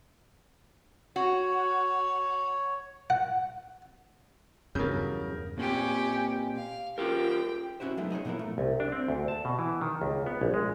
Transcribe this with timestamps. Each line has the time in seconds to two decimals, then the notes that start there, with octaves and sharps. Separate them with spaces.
1.16 F#4 C#5
3.10 F#5
4.75 E2 G2 C#3 F#3 A#4 G6
5.58 A#2 C4 C#4 G4
6.56 F5
6.98 F4 G4 A#4 G5
7.80 C#4 E4 F#4 G4 C5
7.97 F#3 G#3 A3 B3 D#4
8.10 D#4 G#4 C5 C#5
8.25 A#2 F3 B3 E4 A#4
8.39 A3
8.58 C2
8.80 D4
8.92 C4
9.08 D2
9.28 A5
9.45 B2
9.59 E3
9.81 D#3
10.02 C#2
10.26 B3
10.41 A#1
10.54 G#3